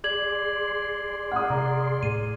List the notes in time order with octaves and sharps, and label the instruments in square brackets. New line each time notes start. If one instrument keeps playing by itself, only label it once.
[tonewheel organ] G#4 D5 C6 [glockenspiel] D6 G#6 F#7
[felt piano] F#5 D#6 [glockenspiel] F6
[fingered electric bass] C3 [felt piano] A#5
[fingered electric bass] A2 [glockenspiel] D#7